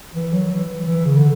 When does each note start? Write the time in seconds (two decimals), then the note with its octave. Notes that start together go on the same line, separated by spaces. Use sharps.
0.15 E3
0.33 F#3
0.51 E3
0.87 E3
1.05 C#3
1.16 D3